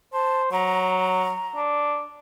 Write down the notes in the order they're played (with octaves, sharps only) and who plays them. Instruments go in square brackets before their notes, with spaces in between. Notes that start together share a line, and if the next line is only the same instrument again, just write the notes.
[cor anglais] C5 [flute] A5
[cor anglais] F#3 [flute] A#5
[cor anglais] D4